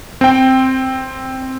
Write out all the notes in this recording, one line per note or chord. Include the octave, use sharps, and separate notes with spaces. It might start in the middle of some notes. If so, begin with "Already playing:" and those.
C4 G5